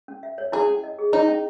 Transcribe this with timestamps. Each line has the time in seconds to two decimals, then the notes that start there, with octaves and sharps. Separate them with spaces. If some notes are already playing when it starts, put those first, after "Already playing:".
0.08 C#4
0.23 E5
0.38 C#5
0.52 E4 G#4
0.68 C#4
0.84 D#5
0.99 G#4
1.12 D#4 E4
1.28 C#4